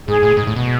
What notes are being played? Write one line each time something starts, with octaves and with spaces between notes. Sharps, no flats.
G#2 G#4
A2
G#2
A2
B2